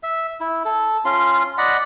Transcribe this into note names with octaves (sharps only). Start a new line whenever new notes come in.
E5
E4
A4
C#4 F4 C6
D5 D#5 F#5 B5